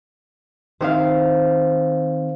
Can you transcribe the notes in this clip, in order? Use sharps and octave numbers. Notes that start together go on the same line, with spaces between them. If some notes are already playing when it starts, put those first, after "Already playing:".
D#3 C4 C5 F5